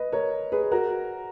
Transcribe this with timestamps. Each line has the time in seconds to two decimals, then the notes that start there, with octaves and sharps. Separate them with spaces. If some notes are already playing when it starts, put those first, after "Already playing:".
Already playing: B4 D#5
0.12 A#4 C#5
0.52 G#4 B4
0.72 F#4 A#4